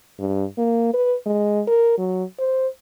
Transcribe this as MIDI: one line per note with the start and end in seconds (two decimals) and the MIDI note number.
0.19 0.44 43
0.58 0.90 58
0.93 1.15 71
1.26 1.61 56
1.67 1.97 70
1.98 2.24 54
2.39 2.67 72